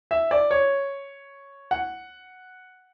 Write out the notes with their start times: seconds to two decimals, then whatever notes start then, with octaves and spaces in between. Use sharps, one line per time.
0.11 E5
0.31 D5
0.51 C#5
1.71 F#5